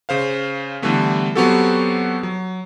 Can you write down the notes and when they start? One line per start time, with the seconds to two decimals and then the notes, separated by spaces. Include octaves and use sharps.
0.09 C#3 C5 F5
0.82 D3 E3 G3 A3 B3
1.35 F#3 B3 C4 F#4 G4 A4
2.23 F#3